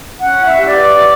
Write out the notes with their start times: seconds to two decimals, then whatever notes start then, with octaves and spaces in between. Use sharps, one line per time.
0.20 C#4 F#5 F#6
0.38 E4
0.44 E5 E6
0.56 G4
0.67 D5 D6
0.74 B4
0.91 C#4